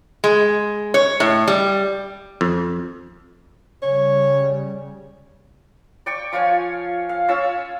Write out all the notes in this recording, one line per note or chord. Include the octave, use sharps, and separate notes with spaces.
G#3
C#5
A2
G3
F2
C#3 G3 C#5
D5 G5 C#6
F3 F4 C#5 G#5
F5
C#4 F4 C#5 E6